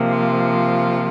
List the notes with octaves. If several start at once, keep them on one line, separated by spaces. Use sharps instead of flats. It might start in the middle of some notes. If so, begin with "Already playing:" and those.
Already playing: C3 F3 A#3
F4